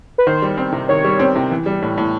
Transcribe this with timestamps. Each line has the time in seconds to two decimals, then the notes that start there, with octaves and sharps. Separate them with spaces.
0.18 B4
0.27 D#3 C5
0.42 G3
0.58 C4
0.72 C3
0.89 D#3 C#5
1.04 G3
1.19 C4
1.36 C3
1.51 E3
1.66 G3
1.82 A2
1.98 A2